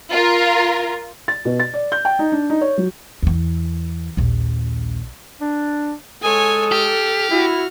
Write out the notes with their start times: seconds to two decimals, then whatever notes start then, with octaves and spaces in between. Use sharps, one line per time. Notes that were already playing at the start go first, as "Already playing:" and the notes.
0.11 F4 A#4
1.28 A6
1.45 B2
1.60 A6
1.74 D5
1.92 G6
2.05 G5
2.19 D#4
2.32 D4
2.50 D#4
2.61 C#5
2.78 F#3
3.23 E2 E3
4.17 A#1 D#2
5.40 D4
6.22 G#3 A4 C#5 G#5 D#6
6.72 G4 F6
7.31 E4 F#4